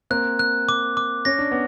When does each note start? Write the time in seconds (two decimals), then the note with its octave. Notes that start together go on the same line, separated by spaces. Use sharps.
0.10 A#3 C4 F#6
0.39 F#6
0.69 D6
0.97 D6
1.25 C#4 A#6
1.39 D4
1.52 B3